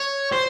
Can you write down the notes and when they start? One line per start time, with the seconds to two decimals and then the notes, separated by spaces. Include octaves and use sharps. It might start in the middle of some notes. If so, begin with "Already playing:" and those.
Already playing: C#5
0.32 C5